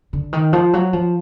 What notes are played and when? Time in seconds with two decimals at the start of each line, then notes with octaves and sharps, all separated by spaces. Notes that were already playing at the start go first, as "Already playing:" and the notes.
0.13 D3
0.33 D#3
0.53 F3
0.73 F#3
0.93 F3